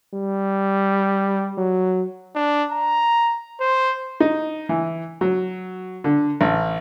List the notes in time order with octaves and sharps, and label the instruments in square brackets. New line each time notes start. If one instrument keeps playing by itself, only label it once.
[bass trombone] G3
F#3
[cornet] D4
A#5
C5
[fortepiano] D#4
E3
F#3
D3
A1